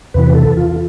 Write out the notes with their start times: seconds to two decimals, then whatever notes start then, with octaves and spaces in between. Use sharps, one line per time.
0.14 E2 C3 E3 B4
0.35 A4
0.57 F4